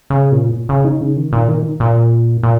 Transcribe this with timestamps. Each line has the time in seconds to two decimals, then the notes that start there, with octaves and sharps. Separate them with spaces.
0.10 C#3
0.32 A#2
0.69 C#3
0.85 D#4
1.01 C#3
1.17 D#3
1.33 A#2
1.48 D#3
1.80 A#2
2.43 A#2